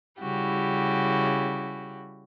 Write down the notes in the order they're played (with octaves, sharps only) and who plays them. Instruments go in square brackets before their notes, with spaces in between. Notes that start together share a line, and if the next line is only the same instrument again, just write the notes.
[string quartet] C#3 G3 E4 F#4 G4